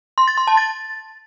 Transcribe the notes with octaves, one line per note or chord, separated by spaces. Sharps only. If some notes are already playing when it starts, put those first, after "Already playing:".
C6
A6
C6
A5
A6